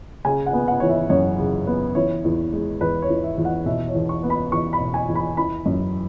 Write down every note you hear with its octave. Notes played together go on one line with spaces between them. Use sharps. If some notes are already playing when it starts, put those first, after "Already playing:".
C#3 G#5
F#5
B3
F#5
E3 C#5
E5
F#2 C#5
C#3
B3
E3 C#5
E2
G#3
E2 B4
C#5
E3
E5
E2
F#5
B2 E5
C#5
E2
C#6
B3
B5
E2 C#6
B5
B2
G#5
E2
B5
E3 B5
F#2